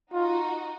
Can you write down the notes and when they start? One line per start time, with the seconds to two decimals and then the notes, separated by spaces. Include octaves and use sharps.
0.13 D#4 F4 F#4